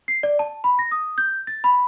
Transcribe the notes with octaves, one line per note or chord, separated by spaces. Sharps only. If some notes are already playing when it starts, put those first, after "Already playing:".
C7
D5
A5
B5
A#6
D#6
G6
A6
B5